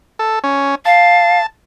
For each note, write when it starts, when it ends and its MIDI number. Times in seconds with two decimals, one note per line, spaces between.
0.19 0.39 69
0.44 0.75 61
0.85 1.40 77
0.85 1.46 81